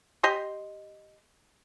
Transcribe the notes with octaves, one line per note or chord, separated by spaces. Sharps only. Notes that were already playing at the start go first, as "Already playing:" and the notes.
G4 D#5 C6